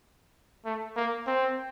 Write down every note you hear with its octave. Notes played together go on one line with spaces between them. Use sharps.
A3
A#3
C4